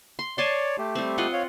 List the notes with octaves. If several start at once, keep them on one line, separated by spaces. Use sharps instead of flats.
C6
C#5 D5 G#5 A5 C6
A3 G4
G3 C4
F4 D#5 F#5
C#5 F5